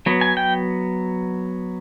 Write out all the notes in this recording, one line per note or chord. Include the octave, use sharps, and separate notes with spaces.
F#3 B3
G#5
G5